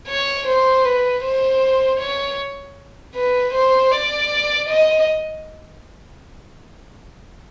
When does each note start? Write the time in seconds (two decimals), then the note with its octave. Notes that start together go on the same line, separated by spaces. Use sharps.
0.08 C#5
0.47 C5
0.85 B4
1.24 C5
2.00 C#5
3.15 B4
3.54 C5
3.92 D5
4.69 D#5